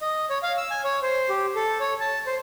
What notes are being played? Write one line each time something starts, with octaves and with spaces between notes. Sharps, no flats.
D#5
C#5
F5
E6
G#5
C#5
C5
G4
A4
C#5
A5
C5